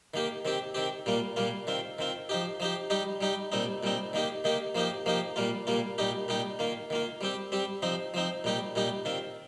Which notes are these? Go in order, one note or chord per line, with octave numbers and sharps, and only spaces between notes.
D#3 A#3 G4
D#3 C4 G4
D#3 C4 G4
A#2 G3 A#3 F4
A#2 G3 A#3 F4
D#3 C4 F4
D#3 C4 F4
F3 D#4 G4
F3 D#4 G4
G3 D#4 G4
G3 D#4 G4
A#2 G3 C4 D#4
A#2 G3 C4 D#4
D#3 A#3 D#4 G4
D#3 A#3 D#4 G4
F3 A#3 D#4 G4
F3 A#3 D#4 G4
A#2 G3 A#3 F4
A#2 G3 A#3 F4
A#2 G3 D#4 G4
A#2 G3 D#4 G4
D#3 A#3 F4
D#3 A#3 F4
G3 C4 G4
G3 C4 G4
F3 C4 D#4
F3 C4 D#4
A#2 G3 D#4 G4
A#2 G3 D#4 G4
D#3 C4 F4